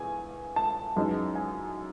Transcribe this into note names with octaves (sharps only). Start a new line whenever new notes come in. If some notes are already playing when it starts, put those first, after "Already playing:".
Already playing: E2 G#5
A5
F#2 E3 G#3 D#4
G#5